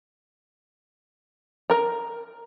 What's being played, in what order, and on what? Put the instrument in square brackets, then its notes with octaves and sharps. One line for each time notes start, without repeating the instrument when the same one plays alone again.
[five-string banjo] A#4 A#5